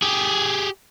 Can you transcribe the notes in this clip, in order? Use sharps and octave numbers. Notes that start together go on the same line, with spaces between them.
G4 G#4